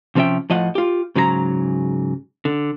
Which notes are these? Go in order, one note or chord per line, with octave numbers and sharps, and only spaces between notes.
C3 F3 C#4 A4 E5 G5
A2 F3 D#5 F5 F#5
F4 G4
G#2 C#3 F#3 G#4 A#5
D3